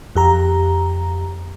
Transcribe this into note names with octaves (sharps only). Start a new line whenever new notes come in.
F2 G4 A#5